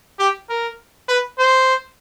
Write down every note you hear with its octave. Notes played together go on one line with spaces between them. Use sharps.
G4
A#4
B4
C5